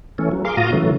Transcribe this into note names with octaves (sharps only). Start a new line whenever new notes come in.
E3 A3 C#4
F#3
G#4 A#4 F5 C6 D6
A2 F4 F#4 F5 A#5 D#6
C#3 E3 F#3 A3